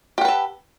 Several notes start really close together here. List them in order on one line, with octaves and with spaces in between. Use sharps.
G4 F#5 B4 A4